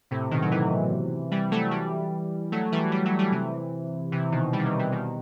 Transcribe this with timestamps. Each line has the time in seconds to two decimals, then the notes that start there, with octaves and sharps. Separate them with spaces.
0.11 A2 C3
0.31 B2 D#3
0.42 F#3
0.51 C3 E3
1.31 E3 G3
1.51 F#3 A3
1.71 E3 G3
2.52 F#3 A3
2.72 E3 G3
2.92 E3 G3
3.05 F#3 A3
3.19 E3 G3
3.32 C3 E3
4.12 C3 E3
4.32 B2 D#3
4.53 E3 G3
4.59 D#3
4.66 C3 E3
4.79 C3 E3
4.92 B2 D#3